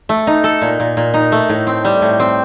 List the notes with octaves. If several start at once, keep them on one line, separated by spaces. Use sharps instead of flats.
A3
D#4
A4
A#2
A#2
A#2
D#4
A3
A2
C4
G3
A2
C4